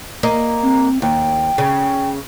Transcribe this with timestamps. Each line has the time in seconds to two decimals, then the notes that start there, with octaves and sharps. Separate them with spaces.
0.23 A#3 D#5
0.63 C4
1.02 D#2 G5
1.58 C#3